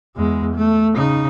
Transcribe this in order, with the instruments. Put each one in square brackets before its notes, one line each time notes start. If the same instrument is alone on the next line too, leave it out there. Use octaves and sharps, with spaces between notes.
[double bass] E2 G#3
A3
C#3 D#4